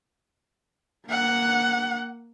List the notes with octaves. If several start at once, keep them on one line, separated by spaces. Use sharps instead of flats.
A#3 F#5